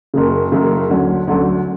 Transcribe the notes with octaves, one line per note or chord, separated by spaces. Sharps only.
F#1 F#2 C#3
F#1 F#2 C#3
D2 D3 F#3 C#4
D2 D3 F#3 C#4